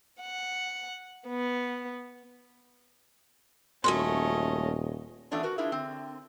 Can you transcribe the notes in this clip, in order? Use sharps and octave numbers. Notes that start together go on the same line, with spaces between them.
F#5
B3
D#1 F#2 F#3 A3 C#4 D#5 C6
E3 A3 B3 C#4 D4 F4
F#4 A#4 B4
D4 E4 F4 G#4 A#4 E5
D3 C4